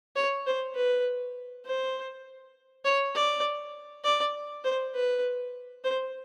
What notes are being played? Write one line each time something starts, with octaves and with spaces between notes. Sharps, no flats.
C#5
C5
B4
C5
C#5
D5
D5
C5
B4
C5